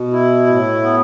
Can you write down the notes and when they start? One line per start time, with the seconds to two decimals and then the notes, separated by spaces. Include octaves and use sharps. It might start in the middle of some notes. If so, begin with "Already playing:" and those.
Already playing: B2
0.12 E4
0.47 A2
0.82 B3